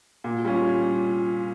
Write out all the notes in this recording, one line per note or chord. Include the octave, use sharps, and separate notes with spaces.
A#2
G3 C#4 F4